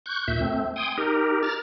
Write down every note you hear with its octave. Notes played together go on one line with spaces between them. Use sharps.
C#6 F#6 G6
D#2 A#2 E5 G6
A3 C4
G5 G#5 C6 D#6
D#4 G4 A#4
A#5 F6 A6